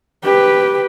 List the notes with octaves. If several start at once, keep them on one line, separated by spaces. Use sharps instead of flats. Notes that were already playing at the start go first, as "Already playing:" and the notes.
G4 B4